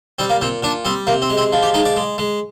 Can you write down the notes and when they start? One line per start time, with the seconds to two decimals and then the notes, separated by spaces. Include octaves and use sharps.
0.19 G3 C4
0.30 A#3
0.41 A#2 C4
0.63 A#2 D4
0.85 G3 C4
1.07 C3 A#3
1.22 C4
1.30 G#3
1.37 C4
1.53 F3
1.63 G4
1.74 G#3 D#4
1.85 D5
1.96 G#3
2.18 G#3